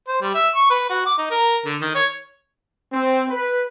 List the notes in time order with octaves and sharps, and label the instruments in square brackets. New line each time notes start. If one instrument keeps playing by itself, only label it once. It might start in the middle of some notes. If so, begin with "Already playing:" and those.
[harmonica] C5
G3
E5
C#6
B4
F#4
D6
D#4
A#4
D3
D#3
C#5
[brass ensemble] C4
B4